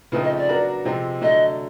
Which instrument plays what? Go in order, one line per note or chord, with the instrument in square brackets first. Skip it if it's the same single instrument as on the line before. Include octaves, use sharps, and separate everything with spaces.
[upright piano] C#3 F3 A3 C4 D#4 [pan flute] B4
[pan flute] D#5
D5
[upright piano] F#3 B3 D4 F#4 A#4
C3 F3 G#3 C4
[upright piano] D3 F#3 A3 [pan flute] D#5